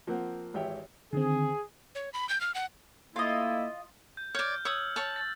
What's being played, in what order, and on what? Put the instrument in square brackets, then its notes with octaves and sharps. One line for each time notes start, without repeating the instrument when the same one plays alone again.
[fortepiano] F3 A#3 C4 F#5
G#1 E3 G4 C#5 E5 G5
[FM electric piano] D3 D#3 C4 [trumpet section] G#4
[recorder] C#5
B5
G6
F6
F#5
[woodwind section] A3 A#3 E4 [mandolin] F4 D#5
[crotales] G6
[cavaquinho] C#5 D5 [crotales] F6 G6
[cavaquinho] C#5 D#6 [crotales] E6 F#7
[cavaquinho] C#5 A5
[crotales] A6